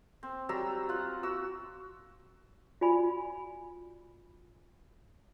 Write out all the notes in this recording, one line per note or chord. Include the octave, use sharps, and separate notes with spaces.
C4
F#3 G3 A#5 E6
F4 F#5
F#4 E6
F4 F#4 D5 G#5 B5